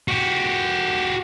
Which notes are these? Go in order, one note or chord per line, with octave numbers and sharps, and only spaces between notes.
F#4 G4